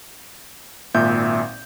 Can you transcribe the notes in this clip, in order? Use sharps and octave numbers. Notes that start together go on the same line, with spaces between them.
G#1 A#2 E5 G6